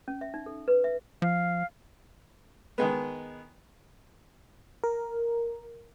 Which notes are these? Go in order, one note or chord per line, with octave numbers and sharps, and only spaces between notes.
C#4
E5
D#4
A4
B4
E5
F3 F5
D#3 G#3 B3
A#4